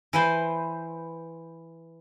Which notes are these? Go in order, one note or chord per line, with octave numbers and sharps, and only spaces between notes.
E3 B4 C5